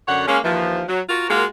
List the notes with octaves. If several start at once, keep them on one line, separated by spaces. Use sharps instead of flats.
F#2 D3 C#5 F#5
G#3 A#3 C#4
D#2 E3 F3
F#3
F4 F#4 A#4
G#3 A#3 F4 F#4 A#4